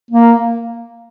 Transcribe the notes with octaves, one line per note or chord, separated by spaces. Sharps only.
A#3